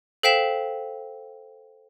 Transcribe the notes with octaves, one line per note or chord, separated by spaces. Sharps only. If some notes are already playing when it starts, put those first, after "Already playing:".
A4 C5 F5 G5 B6 E7